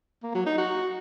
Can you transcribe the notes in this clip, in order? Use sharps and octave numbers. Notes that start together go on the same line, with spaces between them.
A#3
F#3
D#4
F#4